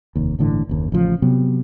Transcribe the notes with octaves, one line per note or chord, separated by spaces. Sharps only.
F1 D#2
G1 A2 D3 E3
F#1 D#2
A1 C#3 F3
C3 F#3 B3